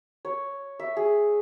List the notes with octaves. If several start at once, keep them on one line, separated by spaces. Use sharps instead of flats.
C#5
E5
G#4